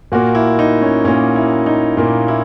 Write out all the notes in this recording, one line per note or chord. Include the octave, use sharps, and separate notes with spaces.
A#2 A#3 F#4
E4
D#4
C#4
A#2 A#3 C#4
E4
D#4
A#2 A#3
E4